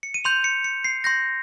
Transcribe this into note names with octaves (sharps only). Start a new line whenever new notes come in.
C#7
D#7
C6 G6 F7
C#7
C#7
C7
C6 G6 A#6